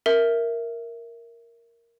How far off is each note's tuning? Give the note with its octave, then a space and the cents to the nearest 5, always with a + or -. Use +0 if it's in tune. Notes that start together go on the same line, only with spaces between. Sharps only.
A#4 +0 E5 +0